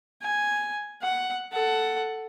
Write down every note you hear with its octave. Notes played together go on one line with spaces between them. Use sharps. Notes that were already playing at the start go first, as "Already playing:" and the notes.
G#5
F#5
A4 F#5